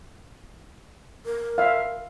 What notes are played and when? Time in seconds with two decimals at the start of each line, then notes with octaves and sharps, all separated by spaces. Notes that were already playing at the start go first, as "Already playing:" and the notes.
1.26 A#4
1.58 E5 F5